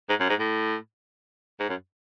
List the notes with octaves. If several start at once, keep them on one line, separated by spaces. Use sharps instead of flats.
G#2
F#2
G#2
A2
G#2
F#2